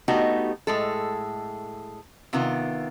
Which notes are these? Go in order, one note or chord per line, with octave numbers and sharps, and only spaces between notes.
A3 B3 D#4 F#4 G4
A2 G#3 A4
C3 D#3 B3 F4